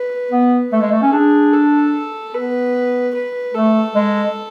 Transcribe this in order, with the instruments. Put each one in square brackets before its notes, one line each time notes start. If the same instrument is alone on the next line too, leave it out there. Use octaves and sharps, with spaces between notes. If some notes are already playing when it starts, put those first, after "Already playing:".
Already playing: [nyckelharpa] B4
[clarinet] B3
[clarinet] A3 [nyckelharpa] A4
[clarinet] G#3
A3
C#4
[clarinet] D4 [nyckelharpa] G#4
[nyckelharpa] A4
[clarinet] B3 [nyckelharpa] B4
[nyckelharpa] B4
[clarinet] A3 [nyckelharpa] A4
[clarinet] G#3